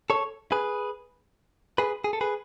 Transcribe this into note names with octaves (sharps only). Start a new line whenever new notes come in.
A4 C#5
G#4 B4
G#4 B4
G#4
A4
G#4 B4